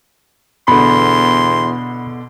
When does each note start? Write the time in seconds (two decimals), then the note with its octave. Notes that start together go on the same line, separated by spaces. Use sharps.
0.68 E2 B2 D3 B5 C6